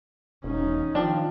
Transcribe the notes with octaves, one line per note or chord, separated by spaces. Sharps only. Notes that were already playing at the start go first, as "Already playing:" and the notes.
E1 C#4 D#4
D#3 F3 D4 F4 G5